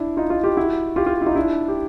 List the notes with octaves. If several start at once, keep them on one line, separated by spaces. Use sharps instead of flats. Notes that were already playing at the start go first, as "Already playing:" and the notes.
Already playing: D4 E4
D#4 F4
D#4 F4
F4 G4
E4 F#4
F4 G4
F4 G4
E4
D#4 F4
D4 E4
G4